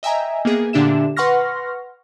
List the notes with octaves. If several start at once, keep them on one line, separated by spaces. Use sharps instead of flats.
D#5 E5 G5 G#5 A#5
A#3 B3 G#4
A#2 D3 D4 G4 E5 E7
B4 F#5 C6 C#6 F6 A#6